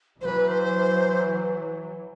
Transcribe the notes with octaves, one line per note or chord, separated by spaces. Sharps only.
E3 F#3 B4 C5
C5